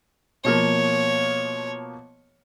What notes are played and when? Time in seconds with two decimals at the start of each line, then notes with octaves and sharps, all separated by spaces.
0.45 B2 F3 A#3 C#5